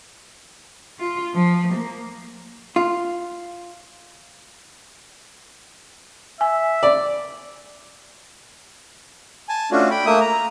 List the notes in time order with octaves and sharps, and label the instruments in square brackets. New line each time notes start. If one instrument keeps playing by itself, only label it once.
[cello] F4
F3
A#3
[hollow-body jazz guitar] F4
[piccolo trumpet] E5 [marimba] G#5
[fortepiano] D5
[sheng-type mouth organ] G#5 A5
A3 C#4 D4 F4 F#4
G5 B5
A3 A#3 E5 D#6
A#5